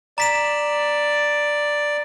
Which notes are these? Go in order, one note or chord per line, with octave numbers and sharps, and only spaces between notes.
D5 A#5 B6 E7